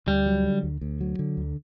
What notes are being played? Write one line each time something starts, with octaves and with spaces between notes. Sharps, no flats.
D2 G3
F#3
D3
D2
D2
F#3
D3
D2